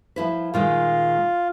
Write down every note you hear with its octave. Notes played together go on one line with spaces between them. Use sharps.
F3 E4 B4
A#2 D#3 G#3 F4